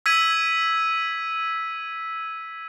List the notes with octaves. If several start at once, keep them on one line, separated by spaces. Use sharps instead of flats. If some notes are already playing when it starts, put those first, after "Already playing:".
E6 G#6 B6 D#7